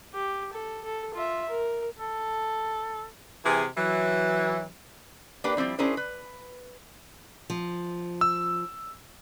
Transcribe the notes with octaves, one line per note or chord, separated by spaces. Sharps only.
G4
A4
A4
F4 E5
A#4
A4
C3 E3 G#4
E3 F#3
A#3 D4 G4 B4
F3 G3 C4 E4
C#4 D4 E4 G#4 A#4 C5
B4
F3
E6